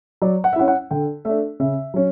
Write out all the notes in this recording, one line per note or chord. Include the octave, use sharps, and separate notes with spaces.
F#3 D5
F#5
E5
C#4 E4 F#5
F#5
D3 G5
A3 D4 E5
C#3 E5
F#3 C#4